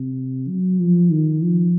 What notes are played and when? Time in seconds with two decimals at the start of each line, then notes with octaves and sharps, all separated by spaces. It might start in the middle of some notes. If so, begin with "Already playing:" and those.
Already playing: C3
0.48 F#3
0.80 F3
1.10 D#3
1.42 F3